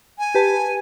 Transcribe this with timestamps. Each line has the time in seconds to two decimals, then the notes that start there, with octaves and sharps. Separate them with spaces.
0.19 G#5
0.35 G4 B4 A5